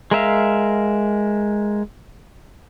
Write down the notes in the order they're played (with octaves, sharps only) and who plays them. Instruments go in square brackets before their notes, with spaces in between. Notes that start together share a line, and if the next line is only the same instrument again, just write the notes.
[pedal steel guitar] G#3 A#4 E5 F5